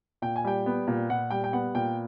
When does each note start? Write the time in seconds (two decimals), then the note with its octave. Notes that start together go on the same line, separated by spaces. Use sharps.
0.22 A#2 G5
0.36 G#5
0.44 G3 G5
0.66 B3
0.88 A#2
1.10 A#2 F#5
1.30 G3 G5
1.44 G5
1.53 B3 F#5
1.75 A#2 G5